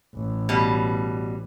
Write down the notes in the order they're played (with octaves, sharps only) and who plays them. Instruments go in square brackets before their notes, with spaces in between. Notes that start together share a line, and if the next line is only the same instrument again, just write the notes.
[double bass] A1
[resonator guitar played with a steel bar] B2 G3